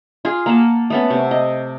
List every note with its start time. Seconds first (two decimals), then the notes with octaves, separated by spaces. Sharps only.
0.25 F4 G#4
0.46 A#3 F#5 A5
0.90 A3 B3 C#4
1.10 C3
1.31 D#5